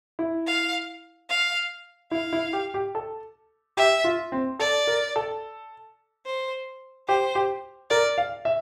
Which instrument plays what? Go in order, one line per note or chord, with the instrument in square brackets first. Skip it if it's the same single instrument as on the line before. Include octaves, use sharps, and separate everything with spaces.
[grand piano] E4
[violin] F5
F5
[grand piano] E4 [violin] F5
[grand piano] E4
G4
G4
A4
[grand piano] G4 [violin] E5
[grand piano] F4
C4
[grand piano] A4 [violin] D5
[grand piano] A#4
A4
[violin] C5
[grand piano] G4 [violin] C5
[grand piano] G4
[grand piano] A#4 [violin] D5
[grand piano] F5
E5